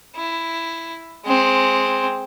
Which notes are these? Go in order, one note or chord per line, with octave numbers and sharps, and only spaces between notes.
E4
G#3 C4